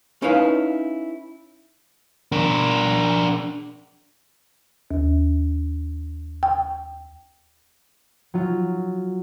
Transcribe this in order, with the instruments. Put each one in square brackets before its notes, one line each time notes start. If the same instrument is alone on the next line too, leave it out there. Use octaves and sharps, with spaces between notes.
[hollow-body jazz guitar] C#4 D#4 E4 B4 F5
[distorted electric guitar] D4 A#4
[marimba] D#2
G5
[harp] F#3 F4